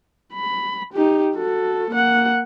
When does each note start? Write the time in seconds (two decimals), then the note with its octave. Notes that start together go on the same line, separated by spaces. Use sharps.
0.33 B5
0.93 D#4 G4
1.34 F#4 A4
1.91 A#3 F#5